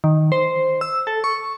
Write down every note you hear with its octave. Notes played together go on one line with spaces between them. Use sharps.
D#3
C5
E6
A4
C#6